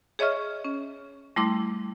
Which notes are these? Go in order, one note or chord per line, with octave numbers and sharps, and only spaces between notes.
G#4 C#5 D#5 E5 C#6 F6
C#4
G3 A3 E4 C6 D6